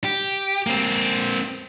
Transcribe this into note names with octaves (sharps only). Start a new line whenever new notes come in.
G4
A#3 C4